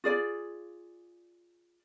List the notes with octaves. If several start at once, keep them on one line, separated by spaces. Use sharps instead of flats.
F4 G#4 D5